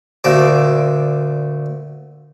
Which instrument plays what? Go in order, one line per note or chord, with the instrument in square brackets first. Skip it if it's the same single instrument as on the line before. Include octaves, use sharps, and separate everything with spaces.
[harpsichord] D2 A#2 A5 D6